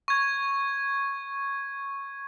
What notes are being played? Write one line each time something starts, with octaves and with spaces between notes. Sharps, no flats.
C#6 G#6